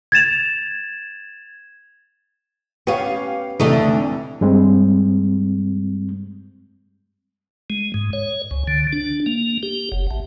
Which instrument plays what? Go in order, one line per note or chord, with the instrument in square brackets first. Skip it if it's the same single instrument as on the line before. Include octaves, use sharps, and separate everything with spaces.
[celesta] G#6 A6 E7 F7
[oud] B3 C#4 [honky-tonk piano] G4 F5 G5
[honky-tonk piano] F1 E3 [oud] D3 A3 D#4
[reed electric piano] G2 G3 G#3 C4
[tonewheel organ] G#3
G#2
C#5
C#2
D3
D4
A#3
G4
F#1
A1